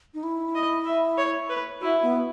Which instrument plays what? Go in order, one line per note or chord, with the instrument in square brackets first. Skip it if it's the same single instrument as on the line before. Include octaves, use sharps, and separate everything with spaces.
[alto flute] D#4
E4
[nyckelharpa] D#5
E5
C#5
B4
[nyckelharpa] E4 [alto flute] F#4
[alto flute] B3